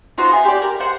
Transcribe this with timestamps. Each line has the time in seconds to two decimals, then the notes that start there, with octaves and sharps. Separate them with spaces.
0.18 D#4 F4 F#4 C5
0.30 E5 G#5 C6
0.45 G4 D5
0.62 A#4
0.80 C5 F#5